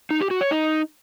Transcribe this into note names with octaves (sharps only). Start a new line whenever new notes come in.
D#4
G4
F#4
C#5
D#4